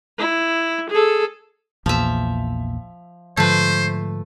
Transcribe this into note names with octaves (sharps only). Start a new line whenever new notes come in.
E4
G#4 A4
A#1 E2 A#2 F3 E5
G#2 D3 F3 A3 B4 C5